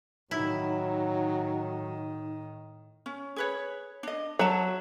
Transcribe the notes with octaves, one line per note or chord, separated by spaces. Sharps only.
A2 D#3 F#3 D#4 E4
C#4
G#4 B4 C#5
D4 D#5
F#3 E5 A5